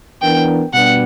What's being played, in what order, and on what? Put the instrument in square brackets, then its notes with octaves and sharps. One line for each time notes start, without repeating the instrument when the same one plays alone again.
[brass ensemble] E3 B3 D4 A#4 [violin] G5
[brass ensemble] B2 G3 B3 D4 [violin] F#5